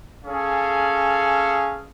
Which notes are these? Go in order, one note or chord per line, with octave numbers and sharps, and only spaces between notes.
C#4 G#4 A4 F5